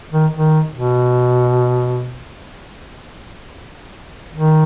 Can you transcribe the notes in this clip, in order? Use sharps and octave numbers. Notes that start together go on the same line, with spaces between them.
D#3
D#3
B2
D#3